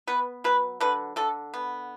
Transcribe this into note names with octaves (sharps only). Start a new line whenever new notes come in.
B3 B4
F#3 B4
D3 B4
D3 A4
B3